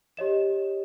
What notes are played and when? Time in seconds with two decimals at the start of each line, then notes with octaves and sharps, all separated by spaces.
0.17 G4 C#5 D#5 E7